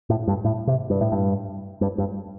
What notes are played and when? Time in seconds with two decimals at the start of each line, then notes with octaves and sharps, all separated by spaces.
0.10 A2
0.28 G2
0.44 A2
0.67 C3
0.90 G2
1.01 A2
1.12 G2
1.81 G2
1.98 G2